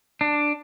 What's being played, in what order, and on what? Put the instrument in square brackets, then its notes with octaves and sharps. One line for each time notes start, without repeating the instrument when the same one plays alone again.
[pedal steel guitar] D4